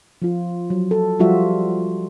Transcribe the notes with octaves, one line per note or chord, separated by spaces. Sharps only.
F3 F4
F#3
A4
F3 G3 F4 F#4 E5